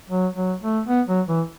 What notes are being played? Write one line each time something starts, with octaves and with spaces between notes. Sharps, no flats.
F#3
F#3
A3
B3
F#3
E3